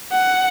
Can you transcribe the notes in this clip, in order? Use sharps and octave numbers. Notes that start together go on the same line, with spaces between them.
F#5